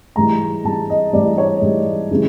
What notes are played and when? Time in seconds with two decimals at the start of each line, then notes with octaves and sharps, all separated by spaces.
0.16 G#2 E3 G3 A#5
0.65 G#2 E3 G3 A5
0.90 D#5
1.13 G#2 E3 G3 D5
1.38 C#5
1.62 G#2 E3 G3
2.11 C#3 E3 G3